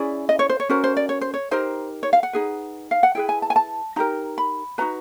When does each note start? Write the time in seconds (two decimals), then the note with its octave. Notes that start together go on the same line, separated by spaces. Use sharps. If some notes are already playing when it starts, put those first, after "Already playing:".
Already playing: C#4 E4 G#4 D5
0.29 D#5
0.39 C#5
0.49 C5
0.60 C#5
0.69 C#4 F#4 A#4 C5
0.84 C5
0.97 D5
1.09 C#5
1.21 C5
1.34 C#5
1.51 D#4 G4 A#4 C5
2.03 C#5
2.13 F5
2.23 F#5
2.33 D#4 G#4 B4
2.91 F5
3.03 F#5
3.15 E4 G#4 B4 G5
3.29 G#5
3.42 A5
3.50 G#5
3.56 A5
3.96 D#4 G4 A#4 A#5
4.38 B5
4.78 D#4 F#4 B4 A#5